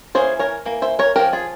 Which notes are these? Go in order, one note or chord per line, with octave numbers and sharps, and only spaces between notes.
E3 A#3 C#4 G#4 C5
A#4 C#5
E3 A#3
C5 E5
A#4 C#5
F3 G#3 C#4 G4 A#4
F4 G#4